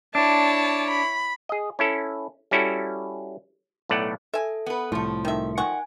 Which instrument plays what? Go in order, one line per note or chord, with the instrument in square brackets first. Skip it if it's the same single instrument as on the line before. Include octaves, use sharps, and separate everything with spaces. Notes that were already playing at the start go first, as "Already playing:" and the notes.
[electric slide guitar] D4 [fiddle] E4 C#5 [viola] A5
[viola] B5
[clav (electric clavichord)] G#4 D#5
C#4 E4 A4
G3 C#4 E4 F#4 A4
B1 A2 A3 D5 F#5
[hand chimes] A4 [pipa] E5 G#5
[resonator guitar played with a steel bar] B3 B4
[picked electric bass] C2 A2 [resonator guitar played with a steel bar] F3 A3
[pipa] D#3 E5
[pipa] D#3 F#5 C#6 [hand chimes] G#5